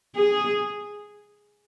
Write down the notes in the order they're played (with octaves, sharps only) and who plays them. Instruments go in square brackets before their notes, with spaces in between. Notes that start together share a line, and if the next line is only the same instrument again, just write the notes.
[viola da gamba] G#4